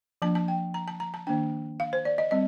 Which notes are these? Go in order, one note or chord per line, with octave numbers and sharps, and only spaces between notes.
F3 A#3 D4 A5
A5
G5
A#5
A5
A#5
A5
D#3 A#3 D4 G5
F5
C5
D5
D#5
G3 C4 D#5